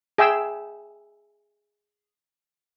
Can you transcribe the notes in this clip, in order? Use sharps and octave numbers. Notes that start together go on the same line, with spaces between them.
G#4 E5 G5 E6